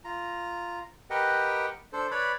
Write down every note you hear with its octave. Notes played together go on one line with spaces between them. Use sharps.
F4 A#5
G4 A#4 B4 D#5 F#5 G5
D4 A4 C5
B4 C#5 D5 B5